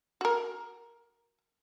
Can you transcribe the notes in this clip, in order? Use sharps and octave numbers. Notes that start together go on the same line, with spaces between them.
F#4 A#4